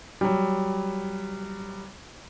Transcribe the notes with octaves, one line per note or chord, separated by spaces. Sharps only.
F#3 G3